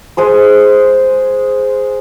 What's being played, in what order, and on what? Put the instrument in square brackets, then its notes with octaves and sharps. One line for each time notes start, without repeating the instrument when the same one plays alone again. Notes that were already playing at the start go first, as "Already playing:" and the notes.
[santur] G#3 G#4 C5